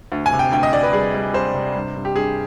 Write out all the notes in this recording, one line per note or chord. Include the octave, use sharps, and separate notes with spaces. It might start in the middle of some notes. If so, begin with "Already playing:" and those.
D2
G#5
C3
G5
D2 G5
D#5
D2 D5
B4
G3 G#4
G3
G3 C5
C3
G2
G2
G4
G2 G#4